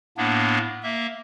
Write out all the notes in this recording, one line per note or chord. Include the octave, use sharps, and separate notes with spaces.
A2 A#3 B3 D4
A#3 E5